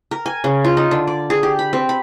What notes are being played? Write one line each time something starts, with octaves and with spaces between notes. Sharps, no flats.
A#4
G#5
C#3
F4
D#4
D3
D5
G#4
G4
B5
C4
B5